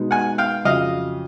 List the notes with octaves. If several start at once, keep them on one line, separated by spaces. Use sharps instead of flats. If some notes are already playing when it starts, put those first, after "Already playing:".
Already playing: B2 G#3 B3 D#4
F#5 G#5
F5 G5
F2 C#3 F#3 D#5 F5